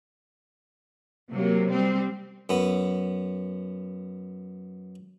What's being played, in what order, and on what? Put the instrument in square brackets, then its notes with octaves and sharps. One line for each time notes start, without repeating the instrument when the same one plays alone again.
[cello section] C3 F#3 A#3
G3 C4
[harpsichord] F#2 B3